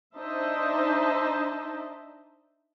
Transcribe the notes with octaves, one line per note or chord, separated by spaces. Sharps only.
D4 D#4 C5 D#5 E5 A5